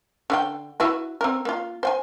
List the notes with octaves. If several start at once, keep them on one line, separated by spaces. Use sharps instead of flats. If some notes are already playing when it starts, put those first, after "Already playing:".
D3 F4 G5
E4 F#4 B4
C4 A#4
A#3 F4
C5 G5 G#5